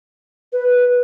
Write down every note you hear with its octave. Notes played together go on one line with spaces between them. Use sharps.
B4